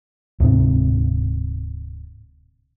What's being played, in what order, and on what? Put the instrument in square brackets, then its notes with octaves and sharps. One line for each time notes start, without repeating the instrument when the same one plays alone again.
[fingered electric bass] D1 G#2 C3 D4